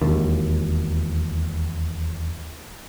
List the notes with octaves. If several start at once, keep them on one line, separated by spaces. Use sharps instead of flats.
E1 D#2